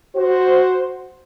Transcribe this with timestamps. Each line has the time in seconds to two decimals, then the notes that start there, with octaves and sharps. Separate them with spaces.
0.16 F#4 C5